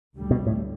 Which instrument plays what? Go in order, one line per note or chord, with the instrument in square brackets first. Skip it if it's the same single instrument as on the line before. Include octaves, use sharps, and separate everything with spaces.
[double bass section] D2 D3 G3
[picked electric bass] B2
A2